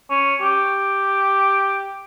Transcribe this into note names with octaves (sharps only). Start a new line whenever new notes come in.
C#4
G4